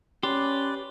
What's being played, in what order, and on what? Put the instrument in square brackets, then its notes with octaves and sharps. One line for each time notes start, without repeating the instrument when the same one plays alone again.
[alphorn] C#4 [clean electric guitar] G4 [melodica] B4 D5 [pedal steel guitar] C6